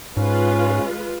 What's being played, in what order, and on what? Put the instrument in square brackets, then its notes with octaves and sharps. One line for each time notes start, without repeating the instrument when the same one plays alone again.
[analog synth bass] G#2 [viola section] G#3 F4 B4 [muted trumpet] C#4